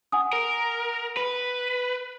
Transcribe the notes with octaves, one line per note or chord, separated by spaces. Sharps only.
F#5 G#5 D#6
A#4
B4